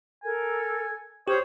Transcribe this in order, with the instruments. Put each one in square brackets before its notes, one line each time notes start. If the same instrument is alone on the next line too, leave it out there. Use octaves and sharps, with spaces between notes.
[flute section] A4 A#4 [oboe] G#5
[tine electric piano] G4 [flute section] C5 D#6 G6 [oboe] C#5